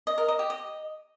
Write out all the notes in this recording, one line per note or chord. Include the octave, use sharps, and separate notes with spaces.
D#5
A#4
D#5
G4
D#5